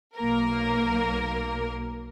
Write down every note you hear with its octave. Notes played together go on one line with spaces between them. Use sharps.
B1 A#3 A#4